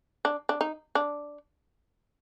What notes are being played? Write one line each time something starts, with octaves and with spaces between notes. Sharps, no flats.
D4
D4
D#4
D4